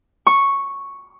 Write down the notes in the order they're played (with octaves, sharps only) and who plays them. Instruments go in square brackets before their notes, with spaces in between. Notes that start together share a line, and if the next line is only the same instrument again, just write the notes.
[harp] C#6